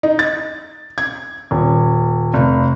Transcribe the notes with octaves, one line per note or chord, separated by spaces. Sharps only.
D#4
A6
G#6
D#1
F1